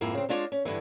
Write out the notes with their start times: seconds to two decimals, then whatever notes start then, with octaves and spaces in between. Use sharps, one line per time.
0.01 F2 G#2 A#3 E4
0.15 C#3 C4
0.29 G#3 D4 F4 G#4 C#5 D5
0.52 C#4
0.65 G2 D3 E3